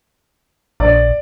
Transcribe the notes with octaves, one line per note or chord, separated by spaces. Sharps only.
A#1 D5